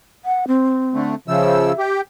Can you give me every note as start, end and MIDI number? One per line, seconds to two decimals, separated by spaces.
0.25 0.45 78
0.47 1.13 60
0.94 1.15 50
0.94 1.15 57
1.28 1.72 49
1.28 1.72 53
1.28 1.83 76
1.28 1.72 88
1.78 2.01 67